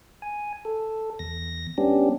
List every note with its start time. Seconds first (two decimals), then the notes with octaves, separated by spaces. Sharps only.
0.22 G#5
0.65 A4
1.19 E2 A#6
1.78 G3 B3 C#4 D4 G4